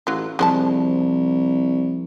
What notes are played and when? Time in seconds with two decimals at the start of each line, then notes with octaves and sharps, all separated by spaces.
0.07 A1 F#3 F4
0.39 C2 F3 G#3 C5 A5